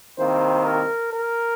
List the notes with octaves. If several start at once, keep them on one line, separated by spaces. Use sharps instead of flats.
C2 C3 D#3 A#3 C5
A#4
A#4